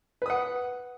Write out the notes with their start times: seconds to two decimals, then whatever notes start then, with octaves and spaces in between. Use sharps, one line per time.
0.22 B4
0.26 D#6
0.30 F#5